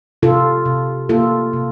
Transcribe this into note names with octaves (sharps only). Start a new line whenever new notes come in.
C3 F4 A4
C3
A#3 F4 A4
C3